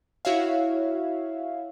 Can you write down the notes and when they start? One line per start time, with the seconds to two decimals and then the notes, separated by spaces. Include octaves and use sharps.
0.25 E4 F#4 C#5 E5 F5